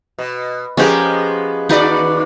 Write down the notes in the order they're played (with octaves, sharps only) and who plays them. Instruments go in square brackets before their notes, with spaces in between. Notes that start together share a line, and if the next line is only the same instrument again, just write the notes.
[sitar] B2
[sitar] F3 G#3 B3 [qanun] C#4 G4 A#4
[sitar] D#2 D5 [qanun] D#4 F#4 B4